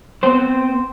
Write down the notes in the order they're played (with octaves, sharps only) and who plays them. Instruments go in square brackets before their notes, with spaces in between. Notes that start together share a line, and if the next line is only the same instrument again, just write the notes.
[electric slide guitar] B3 C4 C5